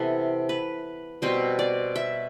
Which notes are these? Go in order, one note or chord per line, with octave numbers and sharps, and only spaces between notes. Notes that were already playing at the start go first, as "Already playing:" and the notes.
Already playing: C3 E3 B3 A4
B4
B2 G3 C4 C5
D5
E5